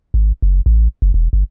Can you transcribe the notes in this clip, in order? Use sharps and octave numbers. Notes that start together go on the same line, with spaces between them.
G#1
F#1
A1
F#1
E1
G1